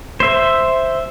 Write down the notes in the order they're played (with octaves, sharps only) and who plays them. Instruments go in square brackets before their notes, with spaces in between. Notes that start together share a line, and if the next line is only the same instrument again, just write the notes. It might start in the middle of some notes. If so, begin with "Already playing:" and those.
[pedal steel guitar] C5 E5